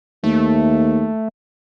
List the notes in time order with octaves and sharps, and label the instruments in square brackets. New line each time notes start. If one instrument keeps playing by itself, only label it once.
[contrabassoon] D#2 [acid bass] A3